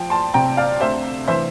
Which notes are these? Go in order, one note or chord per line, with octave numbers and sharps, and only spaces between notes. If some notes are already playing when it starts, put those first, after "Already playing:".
Already playing: F3 G5
A5 C6
C3 G5 A#5
D5 F5
D2 C5 E5
E3 C5 E5